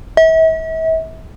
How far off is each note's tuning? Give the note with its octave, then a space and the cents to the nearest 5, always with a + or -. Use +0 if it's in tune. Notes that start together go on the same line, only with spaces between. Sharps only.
E5 -40